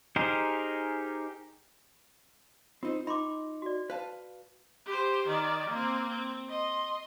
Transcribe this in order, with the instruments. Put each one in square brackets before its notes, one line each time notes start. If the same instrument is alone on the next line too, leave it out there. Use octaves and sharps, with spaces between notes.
[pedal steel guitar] D#4 G4 G#4 A#4 C5
[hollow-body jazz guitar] C4 D#4 C5 [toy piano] F4
[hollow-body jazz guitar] D#4 [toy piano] B5 C6 D6
[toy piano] F#4 D5
[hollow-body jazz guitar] B4 F5 A5
[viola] G4 C5
D#3 D5
A#3 C4
C4
D#5 C6